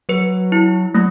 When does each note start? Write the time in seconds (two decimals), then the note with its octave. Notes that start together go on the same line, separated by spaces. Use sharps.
0.09 F#3 B4
0.52 E4
0.94 F#3 A3